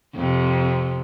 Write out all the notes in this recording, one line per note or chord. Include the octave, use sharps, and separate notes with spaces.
F2 C3